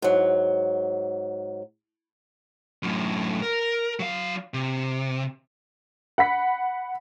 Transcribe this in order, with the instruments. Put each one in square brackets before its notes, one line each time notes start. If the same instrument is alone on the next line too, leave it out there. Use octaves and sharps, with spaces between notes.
[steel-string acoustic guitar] G#2 F#3
[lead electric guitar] F#2 A2
A#4
F#3 F5
C3
[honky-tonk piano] F#5 B5 B6